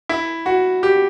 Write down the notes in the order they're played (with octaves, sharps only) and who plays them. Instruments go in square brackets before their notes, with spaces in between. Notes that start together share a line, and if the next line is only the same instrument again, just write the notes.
[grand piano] E4
F#4
G4